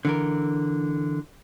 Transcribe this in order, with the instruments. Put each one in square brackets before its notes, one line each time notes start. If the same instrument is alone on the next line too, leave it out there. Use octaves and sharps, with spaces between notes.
[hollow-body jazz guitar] D3 E3 A#4